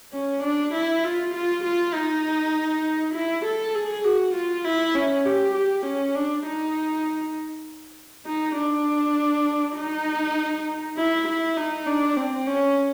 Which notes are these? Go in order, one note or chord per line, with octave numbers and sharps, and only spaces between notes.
C#4
D4
E4
F4
F4
F4
D#4
E4
A4
G#4
F#4
F4
E4
C#4
G4
G4
C#4
D4
D#4
D#4
D4
D#4
E4
E4
D#4
D4
C4
C#4